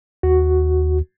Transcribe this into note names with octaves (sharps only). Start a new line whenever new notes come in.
D#2 F#4